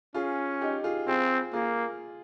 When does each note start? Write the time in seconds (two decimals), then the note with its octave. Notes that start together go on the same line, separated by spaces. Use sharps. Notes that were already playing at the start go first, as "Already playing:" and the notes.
0.14 C#4 F4 G#4
0.61 D#4 G4
0.84 F4 G#4
1.07 C4 F4 G#4
1.53 A#3 F4 G#4